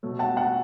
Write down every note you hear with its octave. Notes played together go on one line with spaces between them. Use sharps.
B2 F#3 A3
F#5 A5
F#5 A5